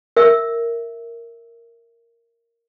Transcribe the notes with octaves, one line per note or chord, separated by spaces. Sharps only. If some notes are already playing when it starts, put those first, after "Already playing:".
A#4 E5 E6